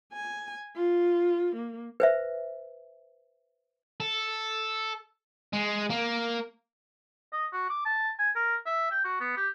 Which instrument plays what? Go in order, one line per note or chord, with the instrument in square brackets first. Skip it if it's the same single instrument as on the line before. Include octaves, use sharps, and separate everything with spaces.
[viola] G#5
F4
A#3
[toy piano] B4 C5 E5
[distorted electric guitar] A4
G#3
A#3
[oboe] D#5
F#4
D6
A5
G#5
A#4
E5
G5
F#4
B3
G4